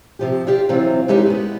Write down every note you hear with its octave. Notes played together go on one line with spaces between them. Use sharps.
C3 F3 G4
D4 F4 G4 D5
C3 E3 F#3 C4 F4 F5
E3 G#3 C#4 D#4 G4 A#4
G#3 B3